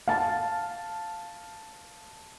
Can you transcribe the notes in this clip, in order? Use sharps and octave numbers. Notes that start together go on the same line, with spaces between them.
F5 A5